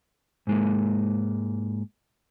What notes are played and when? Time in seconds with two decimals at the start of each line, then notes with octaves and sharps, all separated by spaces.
0.47 G#2 G#3 A#3